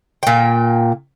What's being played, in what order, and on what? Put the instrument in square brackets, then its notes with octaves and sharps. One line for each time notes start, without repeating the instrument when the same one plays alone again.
[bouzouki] A#2 G5